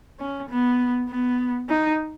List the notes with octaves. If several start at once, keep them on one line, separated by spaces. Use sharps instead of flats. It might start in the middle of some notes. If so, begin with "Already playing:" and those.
C#4
B3
B3
D#4